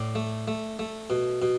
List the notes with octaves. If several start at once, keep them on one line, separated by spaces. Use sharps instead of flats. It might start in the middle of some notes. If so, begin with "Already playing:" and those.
Already playing: A2 D5
A3
A3
A3
B2
B2